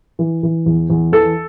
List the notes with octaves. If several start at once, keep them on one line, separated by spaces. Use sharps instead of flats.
E3
E3
E2
E2
E3 A4